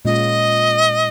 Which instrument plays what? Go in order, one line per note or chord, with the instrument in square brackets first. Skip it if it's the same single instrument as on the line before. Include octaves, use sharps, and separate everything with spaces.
[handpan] A#2 G#3 C#4 F4 [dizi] D#5